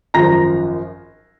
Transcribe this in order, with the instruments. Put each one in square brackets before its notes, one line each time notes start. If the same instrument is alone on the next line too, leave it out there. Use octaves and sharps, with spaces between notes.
[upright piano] G#1 F#2 F3 A#5 A#6